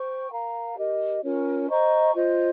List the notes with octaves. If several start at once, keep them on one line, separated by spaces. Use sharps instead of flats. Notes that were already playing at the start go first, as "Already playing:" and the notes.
Already playing: C5 G5 C#6
A#4 F5 A#5
G4 A#4 D#5
C#4 F4 A#4 C#5
C5 D#5 A#5 C#6
F4 C5 D#5